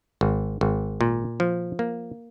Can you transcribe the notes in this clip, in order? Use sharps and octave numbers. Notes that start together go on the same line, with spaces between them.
G#1
G#1
A#2
F3
A#3